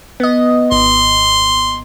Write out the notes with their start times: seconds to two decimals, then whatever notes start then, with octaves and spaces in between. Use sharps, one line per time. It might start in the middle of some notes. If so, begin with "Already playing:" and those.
0.20 B3 D#5
0.72 G#1 C6